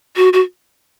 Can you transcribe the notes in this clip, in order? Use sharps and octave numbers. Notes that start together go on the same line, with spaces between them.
F#4
F#4